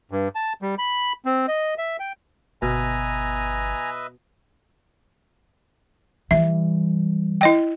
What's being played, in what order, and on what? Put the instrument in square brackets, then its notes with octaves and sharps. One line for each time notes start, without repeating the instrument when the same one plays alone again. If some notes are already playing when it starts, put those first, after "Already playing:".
[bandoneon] G2
A5
G3
B5
C4
D#5
E5
G5
[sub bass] G1 [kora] B2 [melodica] B4 D#5 E5 [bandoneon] G#5 A#5
[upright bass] E3 G3 [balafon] E5
[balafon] E4 D#5 G5